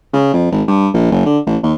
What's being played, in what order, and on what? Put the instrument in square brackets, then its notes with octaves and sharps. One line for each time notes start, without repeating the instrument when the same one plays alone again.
[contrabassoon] C#3
F2
G#1
G2
A#1
F#1
D3
A1
D#2